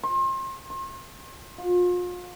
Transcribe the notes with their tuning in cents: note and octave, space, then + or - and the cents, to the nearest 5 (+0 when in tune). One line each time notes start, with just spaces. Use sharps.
C6 +35
C6 +45
F4 +35